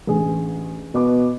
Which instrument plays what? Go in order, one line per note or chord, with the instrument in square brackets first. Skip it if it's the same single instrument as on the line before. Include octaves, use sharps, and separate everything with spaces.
[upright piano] A1 D3 G#4
[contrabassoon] B2 [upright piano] B4 D6